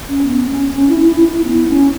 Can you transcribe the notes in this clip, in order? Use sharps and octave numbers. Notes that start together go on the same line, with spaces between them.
C#4
B3
C#4
C#4
E4
E4
E4
B3
C#4